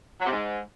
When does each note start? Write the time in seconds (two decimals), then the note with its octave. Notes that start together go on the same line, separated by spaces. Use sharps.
0.21 F#3
0.26 C3
0.32 G#2